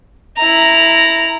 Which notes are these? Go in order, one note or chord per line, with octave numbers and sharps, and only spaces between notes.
E4 A#5